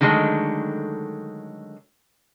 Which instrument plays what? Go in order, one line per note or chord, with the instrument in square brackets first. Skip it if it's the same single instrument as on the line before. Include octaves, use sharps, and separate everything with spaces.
[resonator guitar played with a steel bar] D3 D#3 F#3 G#3 A3